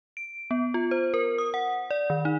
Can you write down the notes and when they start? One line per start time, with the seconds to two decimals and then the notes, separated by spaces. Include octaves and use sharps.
0.17 D7
0.51 B3
0.74 F4
0.91 C5
1.14 A#4
1.38 D#6
1.54 F#5
1.91 D5
2.10 D#3
2.25 D#4